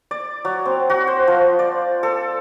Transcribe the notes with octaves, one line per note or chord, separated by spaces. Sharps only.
D5
F#3
C4
F#4
C5
F3
D5
A4